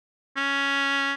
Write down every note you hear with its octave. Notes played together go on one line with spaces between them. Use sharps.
C#4